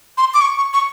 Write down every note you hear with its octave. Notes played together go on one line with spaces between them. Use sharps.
C6
D6
C#6
C#6
C#6